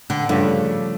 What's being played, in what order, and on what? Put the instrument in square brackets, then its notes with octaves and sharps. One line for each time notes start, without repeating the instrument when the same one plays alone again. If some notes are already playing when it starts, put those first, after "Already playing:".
[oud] D3
[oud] G2 [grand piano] C#3 F3 A3 D4